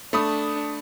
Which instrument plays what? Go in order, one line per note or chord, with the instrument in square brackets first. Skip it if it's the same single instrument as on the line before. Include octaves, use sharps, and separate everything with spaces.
[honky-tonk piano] A3 B5 D#6 [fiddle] D4